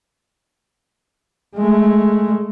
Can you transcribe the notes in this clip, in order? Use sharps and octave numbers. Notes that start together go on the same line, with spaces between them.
G#3 A3